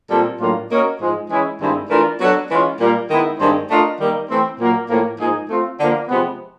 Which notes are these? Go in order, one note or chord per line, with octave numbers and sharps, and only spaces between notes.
A#2 G3 C4 F4 A4
A2 F#3 A#3 D4 F4
A#3 C#4 F#4 A#4 D#5
G#2 F3 G#3
E3 G#3 C#4 E4 G#4
G2 D#3 G#3 C4 E4
E3 A3 D4 F4 A#4
F#3 B3 D4 F#4 A4
E3 G#3 C#4 F4
A#2 G3 A#3
D#3 G#3 B3 E4
G2 D#3 G#3 C4
A3 D4 F4 A#4 D#5
D#3 G3 A#3
E3 A3 C4
A#2 F#3 A#3
A2 F3 A#3
G#2 F3 A#3 D#4 G#4
A3 C4 F4
D3 F3 A#3
C3 F3 G#3 B3